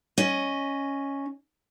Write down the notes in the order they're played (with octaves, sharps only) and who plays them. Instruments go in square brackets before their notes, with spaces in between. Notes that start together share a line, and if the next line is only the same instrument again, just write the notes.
[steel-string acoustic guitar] C#4 D#5